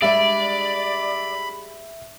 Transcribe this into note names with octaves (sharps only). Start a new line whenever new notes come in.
G3 G#3 D4 D5 E5 B5